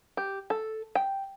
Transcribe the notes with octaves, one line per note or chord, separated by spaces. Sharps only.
G4
A4
G5